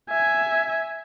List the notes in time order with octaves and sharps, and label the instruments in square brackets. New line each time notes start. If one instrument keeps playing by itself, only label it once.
[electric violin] E5 G#5